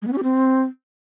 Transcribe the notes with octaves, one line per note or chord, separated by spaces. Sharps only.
G#3
B3
C#4
G4
C4